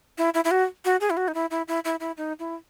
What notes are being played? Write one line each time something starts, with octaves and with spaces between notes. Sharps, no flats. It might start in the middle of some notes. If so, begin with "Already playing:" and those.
E4
E4
E4
F#4
F#4
G#4
E4
F#4
D#4
E4
E4
E4
E4
E4
D#4
E4